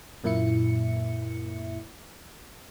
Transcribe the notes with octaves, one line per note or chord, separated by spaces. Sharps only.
F#2 A#2 A#3 E4 E5 C#7